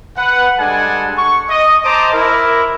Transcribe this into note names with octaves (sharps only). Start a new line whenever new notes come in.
B4 F#5
G3 G#3 D4 A4 F#5 G#5
C#6
D#5
C5 D#5 A5 A#5 D6
E4 A#4